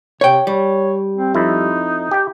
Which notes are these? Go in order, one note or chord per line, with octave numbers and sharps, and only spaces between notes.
C3 C#5 G5
G3 C#5
C4
F2 D#4 E4
G4 G5